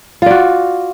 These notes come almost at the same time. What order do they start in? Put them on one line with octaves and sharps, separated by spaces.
F4 D5 F#4